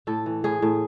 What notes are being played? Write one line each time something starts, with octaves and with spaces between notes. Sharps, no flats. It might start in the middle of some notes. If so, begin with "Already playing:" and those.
A2 A4
E3
A2 G#4
A2